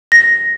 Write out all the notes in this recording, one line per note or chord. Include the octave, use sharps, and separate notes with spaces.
A#6